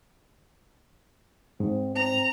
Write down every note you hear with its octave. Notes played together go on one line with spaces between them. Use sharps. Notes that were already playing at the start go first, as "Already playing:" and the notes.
G#2 C4
C4 A#5